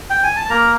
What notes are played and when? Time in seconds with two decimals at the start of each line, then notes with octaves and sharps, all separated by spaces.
0.10 G5
0.23 G#5
0.36 A5
0.49 A#3 A#4 A#5